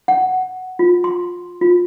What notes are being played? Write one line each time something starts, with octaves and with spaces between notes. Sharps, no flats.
F#5
F4
C6
F4